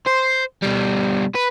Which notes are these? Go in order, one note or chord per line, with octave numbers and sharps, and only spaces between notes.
C5
B2 G3
B4